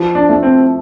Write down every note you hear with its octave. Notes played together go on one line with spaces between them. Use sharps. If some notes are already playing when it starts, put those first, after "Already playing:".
Already playing: F3
D4
A3
C4